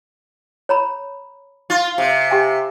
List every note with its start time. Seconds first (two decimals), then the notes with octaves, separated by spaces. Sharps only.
0.69 C#5 A#5 B5
1.70 F4
1.98 C3
2.31 G4 G5 G#5